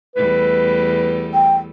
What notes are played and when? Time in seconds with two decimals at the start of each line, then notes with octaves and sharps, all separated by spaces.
0.16 E2 G3 A3 B4
1.34 G5